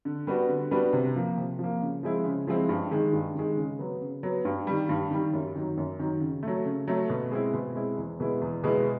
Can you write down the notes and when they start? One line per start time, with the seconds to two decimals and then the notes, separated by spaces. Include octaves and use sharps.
0.05 D3
0.27 G3 B3 D4 F#4
0.49 D3
0.71 G3 B3 D4 F#4
0.93 C3
1.15 F3 A#3
1.37 C3
1.59 F3 A#3
1.81 C#3
2.03 F3 G#3 C4 E4
2.25 C#3
2.47 F3 G#3 C4 E4
2.69 G2
2.91 D#3 G#3
3.13 G2
3.35 D#3 G#3
3.57 C#3
3.79 F#3 B3
4.01 C#3
4.23 F#3 B3
4.45 G2
4.67 D#3 G3
4.89 G2
5.11 D#3 G3
5.33 F#2
5.55 D#3 F#3
5.78 F#2
5.99 D#3 F#3
6.21 C#3
6.43 F#3 A3
6.65 C#3
6.88 F#3 A3
7.09 B2
7.31 G#3 C4 E4
7.53 B2
7.76 G#3 C4 E4
7.97 E2
8.20 B2 G#3 B3 E4
8.41 E2
8.64 B2 G#3 B3 E4